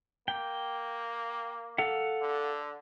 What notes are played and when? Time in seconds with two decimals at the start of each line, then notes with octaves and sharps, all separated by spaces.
0.28 A#3 G5
1.78 A4 F5 F#5
2.21 D3